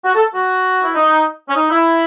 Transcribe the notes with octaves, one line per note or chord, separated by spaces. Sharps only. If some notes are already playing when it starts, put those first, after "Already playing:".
F#4
A4
F#4
E4
D#4
C#4
D#4
E4